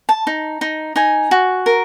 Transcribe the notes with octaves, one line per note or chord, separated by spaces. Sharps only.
A5
D#4
D#4
D#4 G#5
F#4
A#4